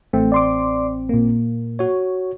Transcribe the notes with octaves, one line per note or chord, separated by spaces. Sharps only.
A1 A3 C4
D5 C6 D6
A#2 A#3
F#4 C#5